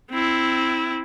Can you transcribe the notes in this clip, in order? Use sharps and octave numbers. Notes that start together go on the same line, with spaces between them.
C4 E4